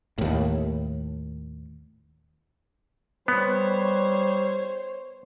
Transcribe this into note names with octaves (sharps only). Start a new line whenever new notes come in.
D#2 A2
G3 B3 C5 C#5